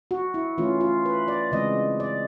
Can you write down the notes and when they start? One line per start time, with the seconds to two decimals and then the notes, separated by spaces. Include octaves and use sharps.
0.11 F#4
0.34 E4
0.58 E3 A3 C#4 F4
0.81 F4
1.05 B4
1.28 D5
1.52 C#3 E3 G#3 C4 D#5
2.00 D5